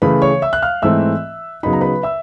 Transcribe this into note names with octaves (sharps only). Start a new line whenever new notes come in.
C#3 E3 A3 B4 B5
C#5 C#6
E5 E6
F#6
F5 F6
G#2 E3 A3 C4 E5 E6
C#3 F#3 B3 D#4 B5
A#5
B4 B5
E5 E6